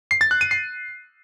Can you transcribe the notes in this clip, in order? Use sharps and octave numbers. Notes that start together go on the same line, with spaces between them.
C7
A6
F#6
D#7
C7